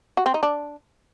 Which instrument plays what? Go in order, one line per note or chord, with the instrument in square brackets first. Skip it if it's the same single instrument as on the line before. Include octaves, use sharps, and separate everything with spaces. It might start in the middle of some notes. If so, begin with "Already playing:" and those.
[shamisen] F#4
C4
D#4
D4